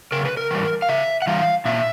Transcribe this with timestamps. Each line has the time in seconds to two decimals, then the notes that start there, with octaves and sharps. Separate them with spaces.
0.12 C#3 A#4
0.25 B4
0.37 A#4
0.51 E3 G3
0.82 F5
0.89 C#3 E5
1.22 F#5
1.27 E3 G3 F5
1.65 A#2 E5